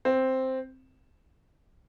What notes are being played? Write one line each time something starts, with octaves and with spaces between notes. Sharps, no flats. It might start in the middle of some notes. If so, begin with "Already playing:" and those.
C4